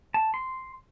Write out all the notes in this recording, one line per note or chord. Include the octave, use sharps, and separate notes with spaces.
A5
C6